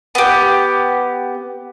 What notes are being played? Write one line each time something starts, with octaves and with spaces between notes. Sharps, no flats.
B3 G4